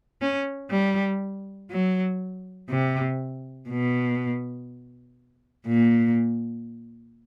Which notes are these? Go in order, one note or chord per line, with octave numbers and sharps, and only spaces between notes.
C#4
G3
F#3
C3
B2
A#2